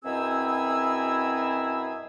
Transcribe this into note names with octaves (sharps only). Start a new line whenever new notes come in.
F#2 B2 C4 E4 G#4 E6